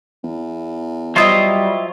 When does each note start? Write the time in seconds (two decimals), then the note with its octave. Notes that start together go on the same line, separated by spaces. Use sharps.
0.23 E2
1.16 F#3 G3 E4 F4 C5 D#5 E5